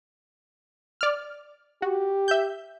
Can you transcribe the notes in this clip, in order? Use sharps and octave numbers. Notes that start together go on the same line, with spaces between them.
D5 F6
F#4 G4
E5 G6